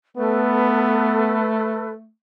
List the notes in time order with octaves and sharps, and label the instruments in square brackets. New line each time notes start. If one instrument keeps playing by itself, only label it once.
[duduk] A3 [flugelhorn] B3 [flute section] A4 B4